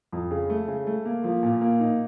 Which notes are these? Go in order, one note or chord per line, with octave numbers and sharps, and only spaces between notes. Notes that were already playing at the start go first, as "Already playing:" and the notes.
F2
C#3
A3
C#3
A3
A#3
F3
A#2
A#3
D#4